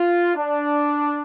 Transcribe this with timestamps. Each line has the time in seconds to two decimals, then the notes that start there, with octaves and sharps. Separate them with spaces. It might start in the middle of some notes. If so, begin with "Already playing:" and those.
Already playing: F4
0.36 D4